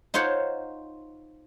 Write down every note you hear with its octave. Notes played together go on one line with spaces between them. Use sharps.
D#4 F4 C5 C#5 F#5